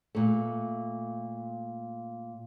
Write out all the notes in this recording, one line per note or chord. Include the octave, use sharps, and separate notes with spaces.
A#2 A3